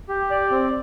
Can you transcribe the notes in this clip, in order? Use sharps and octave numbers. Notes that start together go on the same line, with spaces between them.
G4
D5
C4